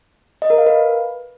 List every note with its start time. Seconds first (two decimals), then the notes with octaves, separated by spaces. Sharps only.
0.42 D#5
0.50 A#4
0.58 F5
0.66 B4